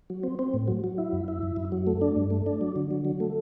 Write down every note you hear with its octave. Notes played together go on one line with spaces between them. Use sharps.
F#3
C4
C4
A2
F#3
F#3
E4
F#2
E4
F#2
F#2
F#3
A3
D4
G2
A3
D4
F#3
D3
F#3
F#3
A3